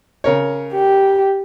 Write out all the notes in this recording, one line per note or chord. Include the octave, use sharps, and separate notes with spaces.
C#3 A#4 C#5
G4